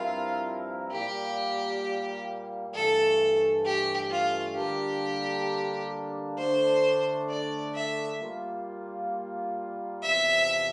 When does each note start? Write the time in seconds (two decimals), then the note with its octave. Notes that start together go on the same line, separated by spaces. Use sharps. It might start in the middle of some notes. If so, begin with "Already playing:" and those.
Already playing: G2 F3 C4 E4 F4 A#4
0.92 A#2 G3 A#3 G4
2.74 G2 E3 A3 A4
3.65 G4
4.10 F4
4.55 D3 G3 A#3 D4 G4
6.38 D3 A3 D4 C5
7.29 D5
7.75 E5
8.20 G3 A#3 F4
10.01 E2 C3 F3 E5